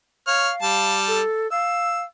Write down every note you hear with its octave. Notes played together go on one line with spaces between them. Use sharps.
C#5 F5 F6
G3 A5
A4
F5 E6